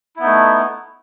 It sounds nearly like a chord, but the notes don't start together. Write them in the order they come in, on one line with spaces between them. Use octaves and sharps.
E4 B3 D#4 A3